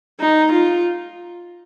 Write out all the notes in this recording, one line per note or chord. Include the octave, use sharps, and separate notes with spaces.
D#4
F4